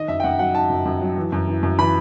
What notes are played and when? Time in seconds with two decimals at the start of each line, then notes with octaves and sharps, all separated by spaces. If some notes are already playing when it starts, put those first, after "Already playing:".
Already playing: D#3 D#5
0.08 F#2 E5
0.20 G5
0.24 F#2 F#5
0.39 F#3 F#5
0.55 D#3 A5
0.70 F#2
0.86 F#2
1.01 F#3
1.17 E3
1.32 F#2
1.48 E3
1.63 F#2
1.78 E3 B5